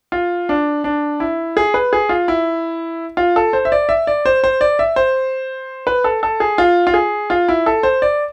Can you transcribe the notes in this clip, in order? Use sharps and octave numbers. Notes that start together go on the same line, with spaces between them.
F4
D4
D4
E4
G#4
B4
G#4
F4
E4
F4
A4
C5
E5
D5
E5
D5
C5
C5
D5
E5
C5
B4
A4
A4
G#4
F4
F4
G#4
F4
E4
A4
C5
D5